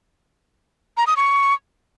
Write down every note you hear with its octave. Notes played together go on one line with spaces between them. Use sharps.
A#5
D#6
C#6